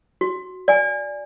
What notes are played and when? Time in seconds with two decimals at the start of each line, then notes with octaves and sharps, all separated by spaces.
0.21 F#4
0.68 D5 G#5